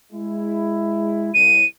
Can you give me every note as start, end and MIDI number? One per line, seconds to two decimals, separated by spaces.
0.13 1.33 56
0.13 1.33 64
1.34 1.62 36
1.34 1.65 99